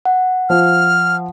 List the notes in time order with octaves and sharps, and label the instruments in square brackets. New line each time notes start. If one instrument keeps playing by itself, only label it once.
[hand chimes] F#5
[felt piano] F3 [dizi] F6